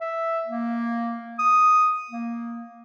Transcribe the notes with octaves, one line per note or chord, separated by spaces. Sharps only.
E5
A#3
D#6
A#3